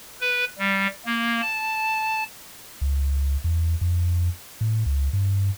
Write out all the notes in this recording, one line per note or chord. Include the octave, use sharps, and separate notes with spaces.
B4
G3
A#3
A5
C#2
E2
F2
A2
C#2
G2